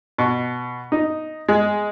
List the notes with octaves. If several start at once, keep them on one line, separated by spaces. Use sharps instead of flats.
B2
D#4
G#3